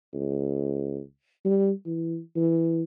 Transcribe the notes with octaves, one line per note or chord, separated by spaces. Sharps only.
C#2
G3
E3
E3